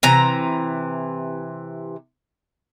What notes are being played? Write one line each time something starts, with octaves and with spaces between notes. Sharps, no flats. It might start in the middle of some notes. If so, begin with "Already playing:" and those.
C3 E3 A#5